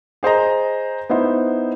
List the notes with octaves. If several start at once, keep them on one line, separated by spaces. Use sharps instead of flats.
G#4 C5 D#5 A#5
B3 D#4 E4 C5